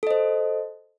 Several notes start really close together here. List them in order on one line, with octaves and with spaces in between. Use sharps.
A4 D#5 C5